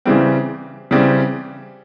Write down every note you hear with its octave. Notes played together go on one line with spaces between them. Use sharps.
C#3 E3 G3 C4
C#3 E3 G3 C4